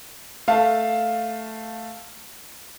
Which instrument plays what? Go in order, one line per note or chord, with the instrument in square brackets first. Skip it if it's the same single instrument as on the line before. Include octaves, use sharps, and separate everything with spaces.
[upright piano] A3 F5 A5